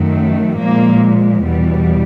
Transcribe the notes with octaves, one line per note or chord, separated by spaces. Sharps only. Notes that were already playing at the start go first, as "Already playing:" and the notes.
Already playing: F#2 D#3 F#3 A3
A#2 F3 G#3 A#3
E2 B2 G3